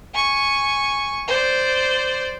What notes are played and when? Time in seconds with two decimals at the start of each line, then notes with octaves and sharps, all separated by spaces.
0.15 G#5 C#6
1.28 C5 D5